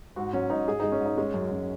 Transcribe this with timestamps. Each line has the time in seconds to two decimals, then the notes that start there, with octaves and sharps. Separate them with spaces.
0.16 G#2 F#4
0.33 F#3 C#4
0.50 G#2 D#4
0.68 G#2 G#4
0.80 G#3 D#4
0.92 C#4
1.00 G#2
1.06 D#4
1.17 G#3 C#4
1.34 F#2
1.51 F#2